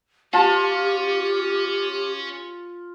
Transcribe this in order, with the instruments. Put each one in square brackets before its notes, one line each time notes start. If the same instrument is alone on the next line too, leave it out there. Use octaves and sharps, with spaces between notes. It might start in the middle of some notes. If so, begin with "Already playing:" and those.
[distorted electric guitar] C#4 [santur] F4 [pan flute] G4 [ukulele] A5